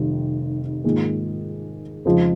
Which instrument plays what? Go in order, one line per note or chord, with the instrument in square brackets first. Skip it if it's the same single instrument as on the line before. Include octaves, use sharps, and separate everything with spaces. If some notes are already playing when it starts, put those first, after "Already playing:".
Already playing: [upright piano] F1 C3 D#3 G3
G#2 D#3 A#3 F4 G#4
F2 C#3 F3 G#3 D#4